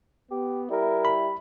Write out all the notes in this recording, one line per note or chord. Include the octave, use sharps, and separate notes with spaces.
B3 G4
G3 E4 A#4
B5